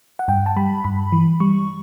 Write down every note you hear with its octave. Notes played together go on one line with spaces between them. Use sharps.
F#5
G2 G5
A5
G3 B5
G2 B5
E3
G3 C#6